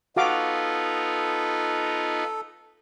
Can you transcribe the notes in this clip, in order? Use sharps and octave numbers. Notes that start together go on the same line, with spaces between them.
B3 D#4 F4 F#4 A4 F5 D6